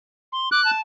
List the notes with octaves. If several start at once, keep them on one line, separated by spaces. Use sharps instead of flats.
C6
D6 F#6
A5